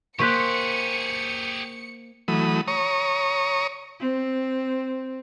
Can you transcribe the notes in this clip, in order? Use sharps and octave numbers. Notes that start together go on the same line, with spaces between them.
A#3 G4 G#4 C5 C#6 F#6 B6 C#7
E3 F#3 A3 B5 D#6
C#5 A#5 C#6 D#6
C4